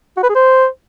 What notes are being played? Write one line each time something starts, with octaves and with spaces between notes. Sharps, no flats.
F#4
B4
G#4
C5